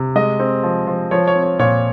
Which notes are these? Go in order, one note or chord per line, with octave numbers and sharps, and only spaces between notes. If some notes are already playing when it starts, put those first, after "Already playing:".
Already playing: C3
G#3 D#5
C4
F3
F3
F3 C#5
C#5
C4
C#5
A#2 C#5